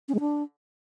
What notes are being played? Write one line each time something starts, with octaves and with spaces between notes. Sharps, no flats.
C#4
G#3
D4